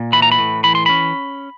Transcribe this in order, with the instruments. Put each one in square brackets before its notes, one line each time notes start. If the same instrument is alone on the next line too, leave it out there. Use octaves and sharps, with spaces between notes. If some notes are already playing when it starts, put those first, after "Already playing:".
Already playing: [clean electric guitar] A#2
E3 B5
A#5
B5
A2
E3 B5
C6
C#4 B5